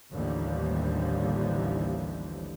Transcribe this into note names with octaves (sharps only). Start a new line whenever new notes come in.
A1 D#2 D3 E3 F3 G3